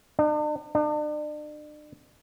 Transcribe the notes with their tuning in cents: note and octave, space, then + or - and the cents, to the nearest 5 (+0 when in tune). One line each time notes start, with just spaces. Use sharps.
D4 +45
D4 +40